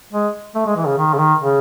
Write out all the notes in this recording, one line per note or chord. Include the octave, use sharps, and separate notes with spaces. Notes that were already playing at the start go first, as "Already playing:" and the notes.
G#3
A3
G#3
E3
C#3
D#3
C#3
D#3
C#3